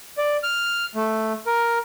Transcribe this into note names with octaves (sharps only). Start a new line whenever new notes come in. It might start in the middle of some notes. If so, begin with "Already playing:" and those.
D5
F6
A3
A#4